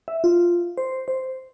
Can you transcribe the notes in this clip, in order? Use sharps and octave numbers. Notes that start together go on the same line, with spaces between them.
E5
F4
C5
C5